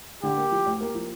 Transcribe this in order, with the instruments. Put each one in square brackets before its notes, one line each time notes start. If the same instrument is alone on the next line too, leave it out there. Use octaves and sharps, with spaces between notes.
[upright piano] D3 [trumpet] G4
[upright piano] A#3
F3
D2
A#3
F3